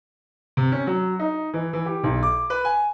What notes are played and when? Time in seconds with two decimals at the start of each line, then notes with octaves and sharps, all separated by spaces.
0.57 C3
0.72 C#4
0.87 F#3
1.19 D#4
1.54 E3
1.73 E3
1.86 G4
2.03 B1
2.23 D6
2.50 B4
2.65 G#5